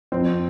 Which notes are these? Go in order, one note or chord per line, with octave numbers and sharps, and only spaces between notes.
F2 C4